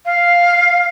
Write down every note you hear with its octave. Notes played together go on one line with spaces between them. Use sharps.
F5